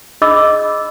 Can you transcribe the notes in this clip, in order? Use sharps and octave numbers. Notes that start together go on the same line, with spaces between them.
D4 G#4 D#5 B5 D6 E6